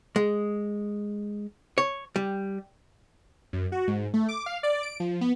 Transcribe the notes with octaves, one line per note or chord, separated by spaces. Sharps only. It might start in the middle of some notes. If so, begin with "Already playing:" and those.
G#3
C#5
G3
F#2
F#4
G#2
A3
D6
F5
D5
D7
F3
B3